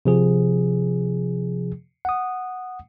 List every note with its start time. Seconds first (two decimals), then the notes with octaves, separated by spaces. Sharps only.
0.05 C3 F3 G#4
2.05 F#5 D#6